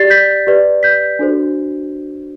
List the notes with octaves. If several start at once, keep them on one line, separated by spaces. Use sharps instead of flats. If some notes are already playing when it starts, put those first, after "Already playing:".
Already playing: G4 D5 A6 C7
G6 B6
G4 B4 D5
G6 B6
D4 F#4 A4 C5